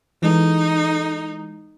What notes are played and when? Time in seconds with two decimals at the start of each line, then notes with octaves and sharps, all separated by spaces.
0.22 E3 G#3 D#4 A4